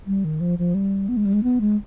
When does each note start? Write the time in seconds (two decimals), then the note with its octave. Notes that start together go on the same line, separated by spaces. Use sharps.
0.07 G3
0.24 D#3
0.40 F3
0.59 F3
0.75 G3
1.09 B3
1.17 G#3
1.25 G3
1.33 G#3
1.43 B3
1.61 G#3